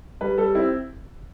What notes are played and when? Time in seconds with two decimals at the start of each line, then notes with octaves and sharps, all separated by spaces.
0.21 G3 B4
0.38 G3 A4
0.55 C4 E4